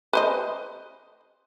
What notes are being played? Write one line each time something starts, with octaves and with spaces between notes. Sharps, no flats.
B4 C5 D#5